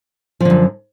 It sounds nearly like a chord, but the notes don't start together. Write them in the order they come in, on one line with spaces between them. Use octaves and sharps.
F3 D3 F#2